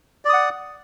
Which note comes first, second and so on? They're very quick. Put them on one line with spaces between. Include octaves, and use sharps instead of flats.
D5 D#6 F#5